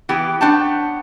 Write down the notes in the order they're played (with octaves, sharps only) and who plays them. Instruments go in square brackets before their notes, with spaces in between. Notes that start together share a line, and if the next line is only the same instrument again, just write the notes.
[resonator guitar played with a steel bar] E3 B3 G4
B3 D4 C#5 G5 A5